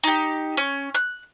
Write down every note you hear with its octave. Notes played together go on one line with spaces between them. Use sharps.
D#4 G4
C#4
F#6